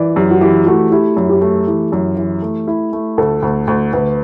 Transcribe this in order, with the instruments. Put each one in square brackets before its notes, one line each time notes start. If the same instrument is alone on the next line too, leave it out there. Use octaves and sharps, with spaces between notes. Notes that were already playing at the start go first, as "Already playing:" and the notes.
Already playing: [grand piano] E3 [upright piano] B4 D5
[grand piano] F#2 [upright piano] G4
[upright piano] F#4
[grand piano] E3 [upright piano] G4
[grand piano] A3 [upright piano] F#4
[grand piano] E4 [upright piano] G4
[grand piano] F#2
[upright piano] G4
[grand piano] A3
E3
F#2
E3
A3
E4
A3
[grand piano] D2 [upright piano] A4
[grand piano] D2
D2
[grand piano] D2 [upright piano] B4